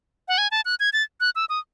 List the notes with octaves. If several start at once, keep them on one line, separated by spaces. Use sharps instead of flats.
F#5
G#5
A5
F#6
G#6
A6
F#6
E6
D#6